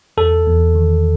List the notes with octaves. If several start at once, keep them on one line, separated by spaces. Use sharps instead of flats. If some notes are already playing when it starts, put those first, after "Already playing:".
E2 A4
E2
D#3